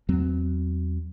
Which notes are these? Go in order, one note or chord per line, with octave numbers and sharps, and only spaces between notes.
E2 F#3 C4